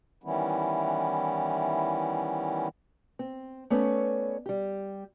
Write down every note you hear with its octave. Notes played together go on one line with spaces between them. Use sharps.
D#3 E3 G3 B3 C#4 E4
C4
A3 B3 C#4 C#5 D5
G3 G4